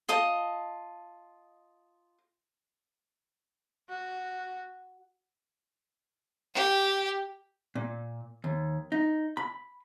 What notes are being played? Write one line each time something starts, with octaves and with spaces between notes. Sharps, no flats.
F4 D#5 A5 D#6
F#4
G4
A#2
D#2
D#4
B5